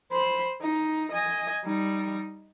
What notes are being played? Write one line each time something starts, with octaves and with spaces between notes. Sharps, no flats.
C5 B5
D#4
D#5 G#5
G3 D#4